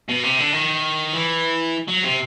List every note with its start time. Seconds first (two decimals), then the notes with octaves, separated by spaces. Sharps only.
0.09 B2
0.24 C3
0.39 D3
0.53 D#3
1.13 E3
1.88 F#3
2.04 C3